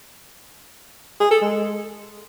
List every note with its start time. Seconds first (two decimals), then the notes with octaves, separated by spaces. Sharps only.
1.20 G#4
1.31 A4
1.42 G#3